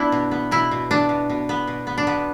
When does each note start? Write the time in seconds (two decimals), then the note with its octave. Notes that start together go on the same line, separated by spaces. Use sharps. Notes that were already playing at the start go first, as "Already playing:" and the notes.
Already playing: B3 D4 E4
0.12 B2
0.31 B3
0.51 B2 E4
0.71 B2
0.91 B3 D4
1.09 B2
1.29 B2
1.49 B3
1.67 B2
1.87 B3
1.98 D4
2.07 B2 B3